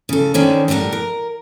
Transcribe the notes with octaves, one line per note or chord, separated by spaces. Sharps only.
C#3 A4
D3 D#3 C#4 C5
A2 G3 E4 A#4 F#5
A#4